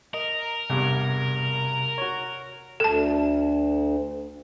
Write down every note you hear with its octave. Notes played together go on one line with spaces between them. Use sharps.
A#4 D#5
E2 G2 C3
F#4 C#5
D2 A4 A5